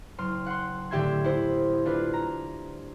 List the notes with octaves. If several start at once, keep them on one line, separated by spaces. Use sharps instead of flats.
F#1 C6 F6
F#5 C6
A2 D3 G4 E5 C6 G#6
E4 C5
D4 F4 B4
A#5